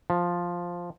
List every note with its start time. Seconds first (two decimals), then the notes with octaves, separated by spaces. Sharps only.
0.10 F3